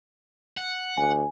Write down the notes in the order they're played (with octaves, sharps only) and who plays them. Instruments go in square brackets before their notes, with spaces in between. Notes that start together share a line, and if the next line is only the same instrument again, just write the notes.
[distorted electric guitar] F#5
[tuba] D2 [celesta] G#5